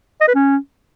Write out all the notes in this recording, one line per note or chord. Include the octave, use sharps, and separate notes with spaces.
D#5
B4
C#4